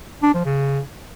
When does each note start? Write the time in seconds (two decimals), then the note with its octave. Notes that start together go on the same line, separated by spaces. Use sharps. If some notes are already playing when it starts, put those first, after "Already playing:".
0.23 D4
0.34 F3
0.45 C#3